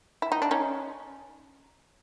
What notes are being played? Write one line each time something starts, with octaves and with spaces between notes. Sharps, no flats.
E4
D#4
D4
C#4 D#4